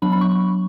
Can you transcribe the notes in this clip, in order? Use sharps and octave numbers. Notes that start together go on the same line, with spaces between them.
F#3 B3 D4 B5
B5
C#6
C#6